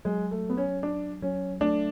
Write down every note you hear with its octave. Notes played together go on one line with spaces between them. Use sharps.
F#3 G#3
A3
G#4
B3
C#4
F#3 D4
F#3 C#4
A3 D4